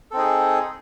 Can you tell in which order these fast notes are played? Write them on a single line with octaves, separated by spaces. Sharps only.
A4 C4 D#4 G#4